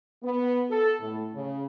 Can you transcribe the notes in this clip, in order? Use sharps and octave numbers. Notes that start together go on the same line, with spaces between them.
B3
A4
A2
C#3